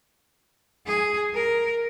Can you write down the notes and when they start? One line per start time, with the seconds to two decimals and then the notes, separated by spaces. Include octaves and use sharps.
0.86 G#4
1.34 A#4